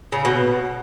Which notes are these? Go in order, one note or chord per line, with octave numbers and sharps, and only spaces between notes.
C#3
B2